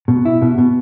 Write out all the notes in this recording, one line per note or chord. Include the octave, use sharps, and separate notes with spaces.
B2
E4
B2
B2